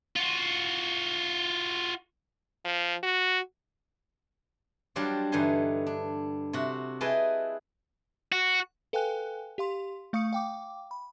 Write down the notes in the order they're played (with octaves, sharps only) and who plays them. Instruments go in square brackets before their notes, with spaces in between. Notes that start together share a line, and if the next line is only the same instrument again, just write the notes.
[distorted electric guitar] F4 F#4
[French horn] F3
F#4
[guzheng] F#3 G3 D4 F4 C5 D5
G2 D3 E3 D#4 G#5 C6
D4
C3 F#4
E4 G#4 B4 D#5 G5 A5
[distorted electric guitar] F#4
[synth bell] A4 B4 F5 G5 G#5 F#6
G4 F5 C6
A3 F5 C#6 D#6 C#7
F5 G5 D6
B5